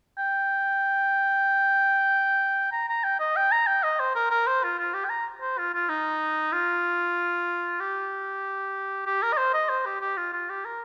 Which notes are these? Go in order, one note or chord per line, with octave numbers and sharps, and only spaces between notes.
G5
A#5
A#5
G5
D#5
G5
A#5
G5
D#5
C5
A#4
A#4
C5
F4
F4
G4
G5
A#5
C5
F4
F4
D#4
F4
G4
G4
A#4
D#5
C5
D#5
C5
G4
G4
F4
F4
G4
A#4